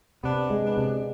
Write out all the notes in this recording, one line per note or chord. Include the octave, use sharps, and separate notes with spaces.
C3 B3 D4
G#3
B3 D4
C3